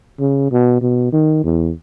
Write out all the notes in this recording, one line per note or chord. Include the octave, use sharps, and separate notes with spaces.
C#3
B2
B2
D#3
E2